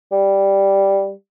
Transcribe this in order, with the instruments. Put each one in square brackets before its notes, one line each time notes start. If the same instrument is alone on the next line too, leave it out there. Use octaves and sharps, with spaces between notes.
[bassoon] G3